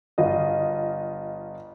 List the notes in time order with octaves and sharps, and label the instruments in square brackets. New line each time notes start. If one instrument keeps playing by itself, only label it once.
[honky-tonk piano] G1 F4 D#5